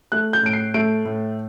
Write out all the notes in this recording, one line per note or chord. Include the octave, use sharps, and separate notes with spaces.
A3 F#6
G6
A2 D7
C7
A3 D7
A2